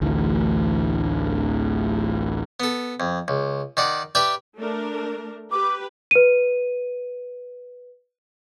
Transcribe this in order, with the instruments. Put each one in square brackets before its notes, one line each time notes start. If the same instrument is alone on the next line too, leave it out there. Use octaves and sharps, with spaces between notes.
[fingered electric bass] A1 D2 A2 E3
[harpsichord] B3 A4
F2
C#2
D#3 D5 F#5
G4 B4 D5 E5 G5
[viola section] A3 D4 A#4
[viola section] G4 B4 [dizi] D6
[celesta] B4 D#7